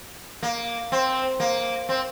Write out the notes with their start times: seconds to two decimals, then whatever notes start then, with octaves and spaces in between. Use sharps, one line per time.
0.43 A#3
0.92 C4
1.40 A#3
1.89 C4